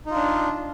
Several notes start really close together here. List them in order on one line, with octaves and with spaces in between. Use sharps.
D#4 F4 D4